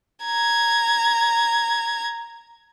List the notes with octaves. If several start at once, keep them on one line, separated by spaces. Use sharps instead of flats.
A#5 G#6